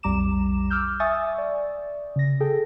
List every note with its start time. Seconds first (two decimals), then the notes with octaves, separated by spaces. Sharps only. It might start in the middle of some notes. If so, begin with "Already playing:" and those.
0.03 B1 F2 G3 A#5 D6 E7
0.70 D6 E6 F6 G6
1.00 E5 G#5 C#6 D#6 E6 A6
1.38 D5
2.16 C#3 A#6
2.40 G#4 A4 G5